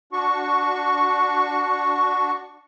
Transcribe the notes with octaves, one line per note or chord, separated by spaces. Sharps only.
D4 F#4 C#6